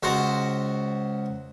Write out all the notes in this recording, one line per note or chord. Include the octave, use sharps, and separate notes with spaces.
C#2 F#4 C5 A#5